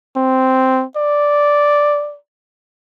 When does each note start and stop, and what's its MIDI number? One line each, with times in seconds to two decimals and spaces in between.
0.16 0.84 60
0.96 2.17 74